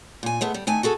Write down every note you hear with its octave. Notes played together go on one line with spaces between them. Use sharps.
A#2 G#5
G#3 A3 B3
G3
D#3 A3 G#5
F#4 G#4 A4